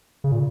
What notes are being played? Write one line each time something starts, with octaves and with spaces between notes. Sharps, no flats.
C#3
A#2